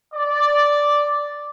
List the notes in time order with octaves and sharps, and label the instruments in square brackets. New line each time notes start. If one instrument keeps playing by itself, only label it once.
[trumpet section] D5